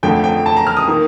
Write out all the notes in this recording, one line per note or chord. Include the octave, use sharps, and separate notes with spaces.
F2 D3 F3 A3 G5
G5
A5
A#5
F6
D#6
D#3 A#3